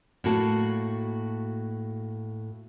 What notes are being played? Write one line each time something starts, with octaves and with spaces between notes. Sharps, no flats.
A2 A#3 F#4 A5